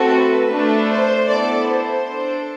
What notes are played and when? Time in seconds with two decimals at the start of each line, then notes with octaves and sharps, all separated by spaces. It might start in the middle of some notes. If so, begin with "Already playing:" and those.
Already playing: A3 C4 F#4 A4
0.12 B4
0.51 A3 D4 A4
0.89 C5
1.29 B3 E4 A4 D5
1.68 C5
2.08 D4 A4